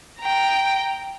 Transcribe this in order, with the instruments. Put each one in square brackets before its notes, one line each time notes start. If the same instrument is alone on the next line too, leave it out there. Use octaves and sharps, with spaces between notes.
[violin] G5 A#5